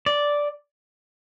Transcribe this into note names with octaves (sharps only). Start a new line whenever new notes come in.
D5